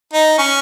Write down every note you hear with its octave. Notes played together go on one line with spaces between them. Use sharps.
D#4
C#4